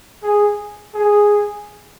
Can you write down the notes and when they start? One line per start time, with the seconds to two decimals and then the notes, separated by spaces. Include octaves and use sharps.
0.23 G#4
0.94 G#4